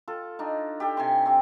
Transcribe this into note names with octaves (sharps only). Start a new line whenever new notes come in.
F4 A4
D4 D#4
G4 A4
C3 G#5 C6
C4 G4